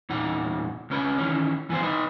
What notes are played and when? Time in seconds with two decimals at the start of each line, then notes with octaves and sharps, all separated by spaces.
0.09 E2 A#2 D#4 F#5
0.90 C#2 C#4 B4
1.18 D#3 E3 C#4
1.70 E3 B3 C5
1.83 D#4 B4